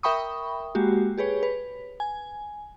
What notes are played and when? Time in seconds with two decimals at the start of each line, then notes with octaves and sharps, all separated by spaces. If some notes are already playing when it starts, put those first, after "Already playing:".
0.03 A#4 E5 G5 B5 C#6 D#6
0.75 G#3 A#3 F#4 G4
1.18 G4 G#4 B4 C#5
1.43 B4
2.00 G#5